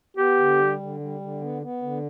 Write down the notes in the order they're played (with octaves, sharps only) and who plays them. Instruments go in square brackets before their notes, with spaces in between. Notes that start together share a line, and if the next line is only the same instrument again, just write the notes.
[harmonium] B3 [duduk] G4
[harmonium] D3
G3
D3
G3
D3
B3
B3
D3